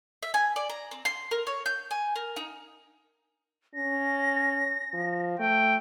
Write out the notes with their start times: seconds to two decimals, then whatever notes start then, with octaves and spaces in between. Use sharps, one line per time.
0.23 E5
0.34 G#5
0.56 D5
0.70 A#5
0.91 C4
1.05 C6
1.31 A#4
1.47 C#5
1.66 G6
1.91 G#5
2.16 A#4
2.36 D#4
3.75 C#4 A#6
4.94 F3
5.39 A3 G5